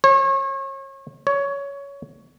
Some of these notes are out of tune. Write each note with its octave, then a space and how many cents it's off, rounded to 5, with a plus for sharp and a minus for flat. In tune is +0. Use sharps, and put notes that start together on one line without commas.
C#5 -35
C#5 +15